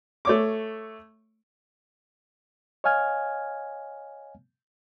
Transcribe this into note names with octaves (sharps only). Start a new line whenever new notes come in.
A3 C#5 D6
C#5 D#5 F5 G#5 F6 G#6